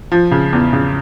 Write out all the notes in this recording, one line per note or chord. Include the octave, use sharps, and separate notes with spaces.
F3
C#3
E2
C#3